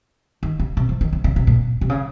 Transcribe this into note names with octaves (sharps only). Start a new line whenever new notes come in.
D#3
C#3
C3
F3
D#3
C#3
C#3
C3
A#2
C3
C#3